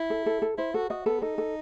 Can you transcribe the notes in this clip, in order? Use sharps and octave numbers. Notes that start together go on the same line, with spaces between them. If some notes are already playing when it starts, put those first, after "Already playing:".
Already playing: E4
A4
A4
A4
E4 C5
F#4 A4
F#4 D#5
B3 A4
D#4 A4
A4